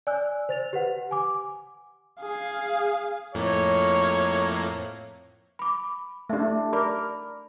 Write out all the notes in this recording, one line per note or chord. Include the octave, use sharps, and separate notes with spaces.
D5 G#5 E6 F#6
C5 A6 F7
G4 B4 F#5
G#5 D6
G#4 F5
F2 A2 A#3 C#5
B5 D6
A3 D4 G4 E5
A#4 D5 B5 D6